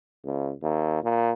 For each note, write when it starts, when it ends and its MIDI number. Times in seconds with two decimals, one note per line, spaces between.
0.24 0.52 37
0.63 0.99 39
1.03 1.33 46